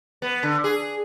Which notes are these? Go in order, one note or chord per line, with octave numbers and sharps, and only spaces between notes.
B3
D3
G#4